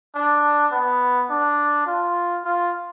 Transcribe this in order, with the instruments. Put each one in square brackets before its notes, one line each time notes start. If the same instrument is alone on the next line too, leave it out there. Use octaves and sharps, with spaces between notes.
[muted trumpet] D4
B3
D4
F4
F4